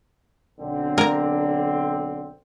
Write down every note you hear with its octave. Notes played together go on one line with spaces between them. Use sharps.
B1 D3 C4
A#4 A#5